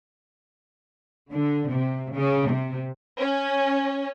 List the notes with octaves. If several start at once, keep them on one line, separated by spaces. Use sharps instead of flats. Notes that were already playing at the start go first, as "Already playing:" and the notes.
D3
C3
C#3
C3
C#4